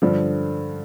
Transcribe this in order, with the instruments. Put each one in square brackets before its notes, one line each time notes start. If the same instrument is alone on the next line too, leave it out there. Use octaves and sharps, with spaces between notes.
[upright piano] G2 D3 F3